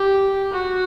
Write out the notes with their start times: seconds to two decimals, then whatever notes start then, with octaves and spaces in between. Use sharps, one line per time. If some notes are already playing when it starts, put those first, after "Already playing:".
Already playing: G4
0.53 F#4